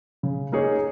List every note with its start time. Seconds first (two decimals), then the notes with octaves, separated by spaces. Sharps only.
0.23 C#3
0.52 A#3 D#4 G#4 C#5